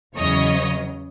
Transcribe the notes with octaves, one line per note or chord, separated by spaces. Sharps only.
E2 C#3 F#3 C#5 D#5